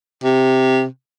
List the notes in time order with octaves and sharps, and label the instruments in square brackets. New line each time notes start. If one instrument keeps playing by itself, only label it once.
[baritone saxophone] C3